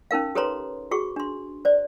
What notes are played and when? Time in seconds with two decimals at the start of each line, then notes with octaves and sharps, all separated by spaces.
0.11 C#4 D#4 A#4 F5
0.35 G4 A4 B4 C#5 A#5 C6
0.91 F#4 G#4 C#6
1.16 D4 C6
1.65 C5 D5